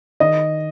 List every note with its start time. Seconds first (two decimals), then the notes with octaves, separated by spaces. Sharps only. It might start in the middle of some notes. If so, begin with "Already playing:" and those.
0.20 D#3 D#5